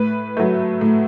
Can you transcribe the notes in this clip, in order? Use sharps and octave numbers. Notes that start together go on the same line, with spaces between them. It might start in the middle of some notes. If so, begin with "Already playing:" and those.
Already playing: A2 B4
F#3 A3
A2